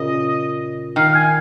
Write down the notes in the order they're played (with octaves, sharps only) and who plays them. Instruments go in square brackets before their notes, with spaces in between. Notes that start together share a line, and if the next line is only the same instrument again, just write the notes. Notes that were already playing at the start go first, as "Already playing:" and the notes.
Already playing: [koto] A#2 C#3 [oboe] D#5
[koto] D#3 [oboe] F5
[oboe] F5
G#5